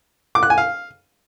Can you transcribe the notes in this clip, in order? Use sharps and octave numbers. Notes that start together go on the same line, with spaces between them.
D6
F#6
G#5
F5